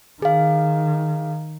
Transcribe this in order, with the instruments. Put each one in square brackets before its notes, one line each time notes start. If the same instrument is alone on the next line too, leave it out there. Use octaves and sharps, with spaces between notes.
[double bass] D#3 [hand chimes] G#4 F5